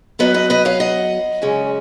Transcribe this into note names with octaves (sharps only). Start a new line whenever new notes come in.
F#2 D#3 F#3 B3 B4 D#5
B4 D#5
B4 D#5
C#5 F5
D#5 F#5
F#2 C#3 G#3 C#4